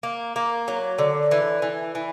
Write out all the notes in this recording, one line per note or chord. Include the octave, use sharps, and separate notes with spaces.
A#3
A#3
F#3
D3
E3
E3
E3